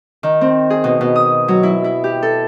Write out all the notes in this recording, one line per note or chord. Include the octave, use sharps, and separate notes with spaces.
D#3
C4
G#4
B2
B2
D#6
F#3
E4
E4
G4
A4